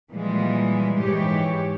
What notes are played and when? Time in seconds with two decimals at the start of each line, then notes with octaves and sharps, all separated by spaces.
0.10 A#2 E3 F3 G3 G#3
1.00 G#2 E3 G4 C#5